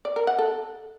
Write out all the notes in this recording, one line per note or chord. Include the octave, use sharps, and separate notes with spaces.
D5
A#4
F#5
A4